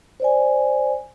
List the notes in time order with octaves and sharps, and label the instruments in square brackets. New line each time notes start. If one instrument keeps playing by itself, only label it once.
[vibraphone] C5 D5 G#5